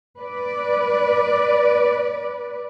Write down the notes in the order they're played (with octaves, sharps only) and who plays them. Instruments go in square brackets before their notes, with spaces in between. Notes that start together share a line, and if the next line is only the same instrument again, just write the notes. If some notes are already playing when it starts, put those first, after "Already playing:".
[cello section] B4 D5